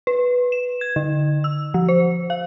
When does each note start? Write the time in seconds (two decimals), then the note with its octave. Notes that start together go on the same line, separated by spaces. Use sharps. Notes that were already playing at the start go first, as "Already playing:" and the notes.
0.07 B4
0.52 E7
0.81 G#6
0.96 D3
1.44 E6
1.74 F3
1.89 C5
2.30 F5